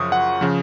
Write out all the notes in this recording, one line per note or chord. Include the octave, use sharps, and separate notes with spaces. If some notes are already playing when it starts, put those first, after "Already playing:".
Already playing: F#2 C#3 F3 C#6 D#6
F#5
C#3 F3